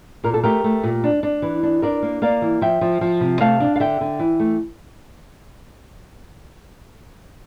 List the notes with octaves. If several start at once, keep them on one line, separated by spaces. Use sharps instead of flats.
A#2 A#4
A4
A3 G4 A#4
A3
A#2
D4
D4
E3
D4
D4 A#4 D5
A#3
A#3 D5 F5
E3
F3 E5 G5
F3
F3
C3
A3 F5 A5
D4
F5
D3 E5 G5
D3
E3
A3